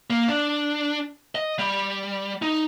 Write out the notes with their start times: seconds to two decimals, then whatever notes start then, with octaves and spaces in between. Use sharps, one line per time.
0.10 A#3
0.28 D4
1.35 D#5
1.59 G3
2.42 D#4